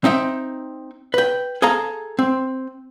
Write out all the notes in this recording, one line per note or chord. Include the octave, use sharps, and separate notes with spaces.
C4 D#4 E5 G5
B4 G5
G#4 A4 F5 A#5
C4